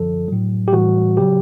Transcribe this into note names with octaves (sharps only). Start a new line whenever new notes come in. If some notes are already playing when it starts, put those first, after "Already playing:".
Already playing: F#2 D3 F3 A4
A2 F#3
G4
A2 E3 G3 F#4
C#3 F#3 G4